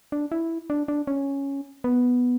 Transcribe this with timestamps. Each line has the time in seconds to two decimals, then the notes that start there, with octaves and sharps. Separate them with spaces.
0.12 D4
0.32 E4
0.70 D4
0.88 D4
1.07 C#4
1.84 B3